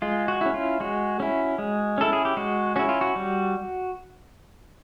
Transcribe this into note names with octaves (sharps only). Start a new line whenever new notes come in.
G#3 F4
F#4
C#4 E4
F4
G#3 F#4
C#4 E4
G#3
C#4 E4 A4
G#4
G4
G#3 F#4
C#4 E4 F#4
F4
F#4
G3